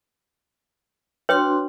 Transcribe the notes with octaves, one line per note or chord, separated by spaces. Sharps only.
D4 F#4 B4 C#5 G5 C6